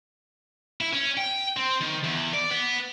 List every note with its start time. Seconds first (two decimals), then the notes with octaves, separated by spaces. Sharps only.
0.81 E4
0.93 C#4
1.17 G5
1.57 C4
1.81 D#3
2.04 E2
2.34 D5
2.51 B3